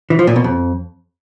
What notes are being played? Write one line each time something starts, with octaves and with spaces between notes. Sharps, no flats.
E3
F3
A#2
B2
F2